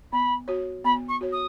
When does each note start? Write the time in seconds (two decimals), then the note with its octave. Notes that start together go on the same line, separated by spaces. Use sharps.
0.12 B3 B5
0.48 F#4 C#5
0.84 B3 B5
1.08 C#6
1.21 F#4 C#5
1.32 D#6